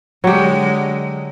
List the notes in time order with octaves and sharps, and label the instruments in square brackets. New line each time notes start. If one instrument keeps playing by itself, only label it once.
[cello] D3 G#3 [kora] F#3 G4